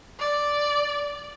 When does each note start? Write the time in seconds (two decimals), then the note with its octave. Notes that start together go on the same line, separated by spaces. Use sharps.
0.19 D5